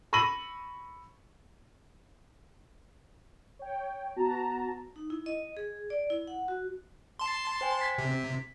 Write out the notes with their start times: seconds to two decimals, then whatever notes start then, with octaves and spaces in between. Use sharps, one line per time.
0.13 B5 C#6 E6 A#6 D#7 F#7
3.59 C#5 G5
4.16 B3 F#4 A5 A#5
4.96 D#4
5.10 E4
5.26 D#5
5.57 G#4
5.90 D5
6.10 E4
6.28 F#5
6.48 F#4
7.19 A5 C6
7.61 C5 G5 G#5
7.81 G#6 B6
7.98 C3